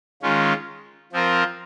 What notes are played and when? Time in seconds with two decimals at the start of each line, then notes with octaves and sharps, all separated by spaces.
0.22 D#3 G#3 C#4 F4
1.12 F3 C4 F4 A#4